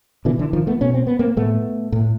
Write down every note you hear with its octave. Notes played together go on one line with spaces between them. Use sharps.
B2 D3 E3
D3 E3
D#3 F3
A3 B3
B2 C#4
C4
B3
A#3 C4
A2 A3 B3
A2